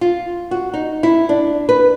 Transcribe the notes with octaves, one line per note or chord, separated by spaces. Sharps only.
F4
F#4
D#4
E4
D4
B4